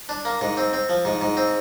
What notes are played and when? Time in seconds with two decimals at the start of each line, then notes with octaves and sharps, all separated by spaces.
0.09 D4
0.25 A#3
0.41 G#2
0.57 C4
0.73 C4
0.89 F3
1.05 G#2
1.22 G#2
1.37 C4